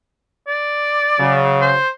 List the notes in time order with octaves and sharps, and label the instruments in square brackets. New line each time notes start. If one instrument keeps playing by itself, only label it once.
[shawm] D5
[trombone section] C#3 F#3
[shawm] C5